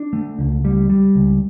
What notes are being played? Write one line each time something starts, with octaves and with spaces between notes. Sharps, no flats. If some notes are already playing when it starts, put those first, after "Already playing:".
Already playing: D4
A3
C#2
G3
G3
C#2